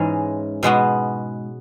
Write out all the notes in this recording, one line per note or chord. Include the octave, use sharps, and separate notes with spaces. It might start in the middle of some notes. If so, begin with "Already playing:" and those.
Already playing: G#2 E3 G#3 C#4
B2 G#3 B3 F#4